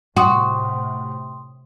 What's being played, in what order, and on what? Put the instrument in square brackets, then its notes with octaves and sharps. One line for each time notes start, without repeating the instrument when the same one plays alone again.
[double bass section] A2 C3 [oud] F#4 [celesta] G5 C6 D#6